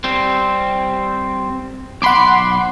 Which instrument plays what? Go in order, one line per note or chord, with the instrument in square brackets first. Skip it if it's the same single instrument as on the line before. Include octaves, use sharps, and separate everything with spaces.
[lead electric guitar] G3 C4
[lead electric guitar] B1 C6 [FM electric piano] F#5 B5 D6